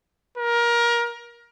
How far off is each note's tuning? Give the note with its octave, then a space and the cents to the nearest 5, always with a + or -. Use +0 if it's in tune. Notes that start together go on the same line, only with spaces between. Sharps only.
A#4 +25